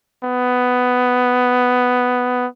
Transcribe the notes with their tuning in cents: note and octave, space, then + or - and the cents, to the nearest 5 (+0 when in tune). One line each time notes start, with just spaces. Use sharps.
B3 +10